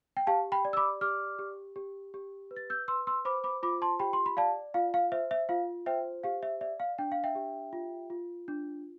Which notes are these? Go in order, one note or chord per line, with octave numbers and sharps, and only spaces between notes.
G5
G4 F5 A5
G5 B5
D5
E6
B5 D6
G4 D6 F6
G4
G4
G4
B4
A6
E6 G6
B4 C6 E6
C6 E6
C5 B5 D6
B5 D6
F4 B5 D6
A5 C6
G4 G5 B5
C6
B5
D5 F5 A5
F4 F5
F5
C5 E5
E5
F4 F5
C5 E5 G5
G4 F5
E5
D5 E5
F5
D4 G5
F5
E5 G5
G4
F4
F4
D4